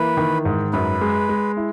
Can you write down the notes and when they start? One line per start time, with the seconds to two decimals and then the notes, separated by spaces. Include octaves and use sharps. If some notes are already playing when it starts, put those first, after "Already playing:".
Already playing: E3 A#3 B4
0.17 D#3
0.45 G#2
0.73 F#2 B4
1.01 G#3
1.29 G#3
1.57 E4